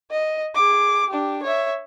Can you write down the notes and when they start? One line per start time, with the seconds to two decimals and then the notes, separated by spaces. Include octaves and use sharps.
0.11 D#5
0.55 G#4 D6
1.09 D4 G4
1.43 C#5 E5